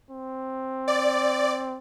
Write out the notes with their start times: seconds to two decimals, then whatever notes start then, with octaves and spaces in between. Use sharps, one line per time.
0.10 C4
0.88 D5